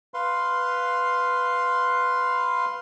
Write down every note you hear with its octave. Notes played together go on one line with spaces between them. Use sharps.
B4 F5 C6